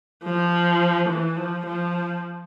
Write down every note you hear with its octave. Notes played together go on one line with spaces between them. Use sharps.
F3
E3
F3
F3